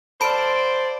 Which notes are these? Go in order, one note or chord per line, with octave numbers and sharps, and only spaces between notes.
A4 C5 D5 F5 B5 D7